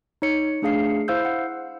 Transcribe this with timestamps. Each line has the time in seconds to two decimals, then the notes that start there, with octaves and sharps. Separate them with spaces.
0.22 D#4 C#5 C#7
0.62 A3 D4 G#4 F5 C7
1.08 E4 C5 F5 E6 G6
1.25 F#5